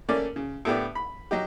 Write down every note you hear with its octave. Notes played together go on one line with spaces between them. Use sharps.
A3 A#3 C#4 D5
C#3
A2 A3 B3 D4 G4
B5
F#3 D#4 G4